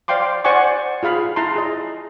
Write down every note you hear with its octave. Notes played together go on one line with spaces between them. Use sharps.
C5 D5 F5 G5 C6 D6
C5 D5 F#5 G#5 C#6 D6
F4 G#4 F5 B5
E4 A5 A#5 C6
G#4 D#5